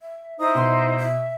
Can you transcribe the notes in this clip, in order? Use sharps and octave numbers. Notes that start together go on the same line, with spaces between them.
E5
D#4 E4 C5 D#6
B2 C6
E5